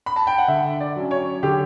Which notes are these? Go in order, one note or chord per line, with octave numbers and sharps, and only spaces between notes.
B5
A5
G5
F#5
D3 E5
D5
F#3 C#4
C#5
D3 G4